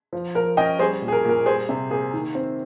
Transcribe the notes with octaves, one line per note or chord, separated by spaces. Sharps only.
F3
F3 A#4
C#4 D#5 G5
G3 G#4 C5
A#2
G#4
A#4
A#2 A#4
G3 G#4 C5
C3
A#3 G#4
D#3
C4